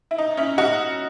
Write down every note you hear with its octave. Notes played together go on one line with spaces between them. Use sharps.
E4
D#4
C#4 E4
D#4 F#4